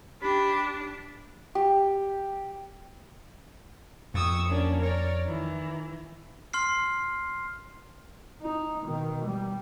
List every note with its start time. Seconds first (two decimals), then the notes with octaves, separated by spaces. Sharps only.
0.22 D4 G4 B5
1.55 G4
4.14 F2 C#6 D#6 E6
4.47 A#3 C#4 D4
4.80 A#4 C#5 D5
5.24 D#3 E3
6.53 C6 F6 C7
8.41 D#4
8.84 B2 D#3
9.25 G3